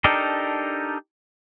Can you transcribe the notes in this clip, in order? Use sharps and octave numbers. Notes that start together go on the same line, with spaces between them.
D4 D#4 G4 A4 A#4